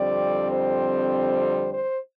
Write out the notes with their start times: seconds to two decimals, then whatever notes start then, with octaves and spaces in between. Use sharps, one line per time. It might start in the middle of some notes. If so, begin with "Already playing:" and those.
Already playing: F2 D3 G3 C4 D5
0.51 C5
1.73 C5